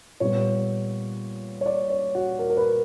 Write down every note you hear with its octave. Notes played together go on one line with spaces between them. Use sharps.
A#2 G3 B3 C#5
C#5
D5
C#5
F#4
A#4
A#4
B4